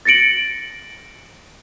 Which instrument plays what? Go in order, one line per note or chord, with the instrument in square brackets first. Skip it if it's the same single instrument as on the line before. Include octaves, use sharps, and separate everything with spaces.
[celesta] A6 A#6 C#7 D7 F#7